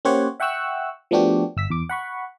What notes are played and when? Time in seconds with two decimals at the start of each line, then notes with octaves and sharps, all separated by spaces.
0.05 A#3 C#4 G4 C5 C#5 F#5
0.40 E5 F#5 G5 C#6 E6 F#6
1.11 F3 A3 B3 D4 F#4 G4
1.57 G1 E6 B6
1.70 E2 D6
1.89 F#5 B5 C#6